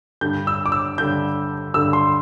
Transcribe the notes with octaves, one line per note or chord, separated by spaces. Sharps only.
G2 D3 G3 G6
E6
D6
E6
G2 D3 G3 G6
G2 D3 G3 E6
C6